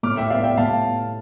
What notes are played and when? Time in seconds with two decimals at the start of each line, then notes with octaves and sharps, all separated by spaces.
0.03 A2 D6 F6
0.17 E5 G5
0.30 G3 B3 D5 F5
0.44 E5 G5
0.57 A2 F5 A5